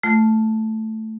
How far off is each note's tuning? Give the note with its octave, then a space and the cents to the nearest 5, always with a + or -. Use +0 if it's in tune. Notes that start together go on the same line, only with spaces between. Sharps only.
A3 +0 F4 +0